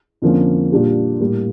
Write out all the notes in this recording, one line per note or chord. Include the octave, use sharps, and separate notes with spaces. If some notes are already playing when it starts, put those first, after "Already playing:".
F2 D3 F3 A#3 C#4
A#2 G3 D4 G4
A2 G3 A#3